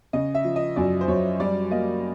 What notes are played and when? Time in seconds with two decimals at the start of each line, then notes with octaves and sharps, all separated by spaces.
0.13 C#3 D#5
0.35 E5
0.45 F3
0.56 D#5
0.76 F#2 D5
1.01 C5
1.08 F#2 C#5
1.40 G3 D5
1.71 A#3 D#5